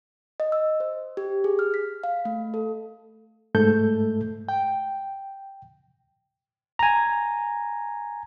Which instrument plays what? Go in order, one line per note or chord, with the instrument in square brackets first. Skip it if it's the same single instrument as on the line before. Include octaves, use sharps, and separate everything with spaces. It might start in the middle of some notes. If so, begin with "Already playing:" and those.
[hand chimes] D#5
E6
C5
G4
G#4
F6
B6
F5
A3
A4
[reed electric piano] G#2 A3 A4 G6
G5
[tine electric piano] G#5 A#5